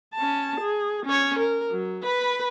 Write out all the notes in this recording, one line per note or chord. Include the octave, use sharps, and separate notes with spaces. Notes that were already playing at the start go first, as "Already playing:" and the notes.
C#4 A5
G#4
C#4 C#5
A#4
F#3
B4 B5